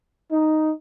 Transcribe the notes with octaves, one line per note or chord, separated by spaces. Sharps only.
D#4